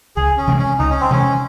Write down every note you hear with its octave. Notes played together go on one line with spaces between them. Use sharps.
C#2 G#4
C#4
C3 E3 G#3
C#4
C#2 D#4
C#4
C4
C3 E3 G#3 C#4